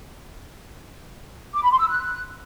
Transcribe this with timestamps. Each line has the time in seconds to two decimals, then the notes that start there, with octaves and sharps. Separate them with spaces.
1.53 D6
1.62 B5
1.71 C6
1.79 E6
1.88 F#6